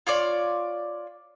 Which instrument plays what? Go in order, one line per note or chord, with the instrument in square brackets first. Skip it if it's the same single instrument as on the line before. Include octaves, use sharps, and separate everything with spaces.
[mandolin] F4 C#5 D5